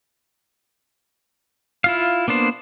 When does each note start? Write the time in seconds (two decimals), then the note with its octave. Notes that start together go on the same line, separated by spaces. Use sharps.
1.84 E4 F4 F5
2.28 A#3 B3 D4 C5